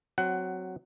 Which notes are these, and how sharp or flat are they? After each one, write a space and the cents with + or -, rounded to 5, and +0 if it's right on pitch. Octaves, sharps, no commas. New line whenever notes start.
F#3 +0 C4 -5 F#5 +15